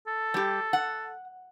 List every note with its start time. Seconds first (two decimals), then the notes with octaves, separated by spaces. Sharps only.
0.07 A4
0.34 G3 G4
0.73 F#5